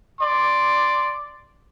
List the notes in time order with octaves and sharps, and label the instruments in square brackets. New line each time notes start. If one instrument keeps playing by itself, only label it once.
[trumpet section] D5 C6